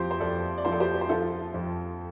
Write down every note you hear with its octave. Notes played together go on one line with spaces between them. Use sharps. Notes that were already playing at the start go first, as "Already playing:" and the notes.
Already playing: F2 F3 G4 C5
C5
F2 A4 D5
D5
F3 C5
A4 D5
G4 C5
C5
F3 F4 A4
F2